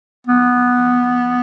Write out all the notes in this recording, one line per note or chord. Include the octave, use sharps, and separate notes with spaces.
B3